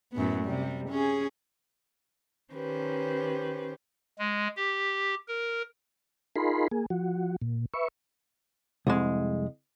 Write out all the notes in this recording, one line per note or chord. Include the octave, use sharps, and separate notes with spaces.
F#2 A2 B3
C3 G3
C#4 G#4
D#3 C#4 G4 B4 C5
G#3
G4
A#4
D#4 F4 G#4 A#4 B5 C6
A#3 G#4
F3 F#4
A#2
B4 E5 C#6
C2 F2 G#3